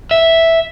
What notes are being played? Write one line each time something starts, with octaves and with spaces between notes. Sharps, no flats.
E5